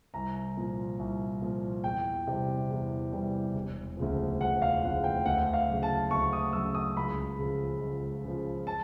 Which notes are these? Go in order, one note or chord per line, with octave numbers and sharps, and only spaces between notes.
C2 A#5
A#2 F3
C2
A#2 F3
E2 G5
C3 E3 G3
E2
C3 E3 G3
E1
D2 C#3 F3
E1 F#5
F5
D2 C#3 F3 F#5
G5
D2 F#5
F5
C#3 F#3
A5
D2 C#6
D#6
C#3 F#3 E6
D#6
C#2 B5
C#3 F3
C#2
C#3 F3
A5